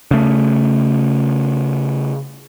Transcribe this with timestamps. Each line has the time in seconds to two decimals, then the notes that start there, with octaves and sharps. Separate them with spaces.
0.11 C#3 A3